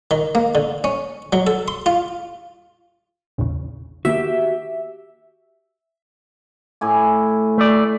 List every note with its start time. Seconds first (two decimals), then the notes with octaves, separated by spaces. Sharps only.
0.11 D#3
0.35 A#3
0.55 D3
0.84 C#4
1.33 F#3
1.47 A4
1.68 C6
1.86 F4
3.38 A#1 E2 C#3
4.05 D#3 A#3 B3 F#4 G4 E5
6.81 A2 G#5 D6
7.58 A3 D5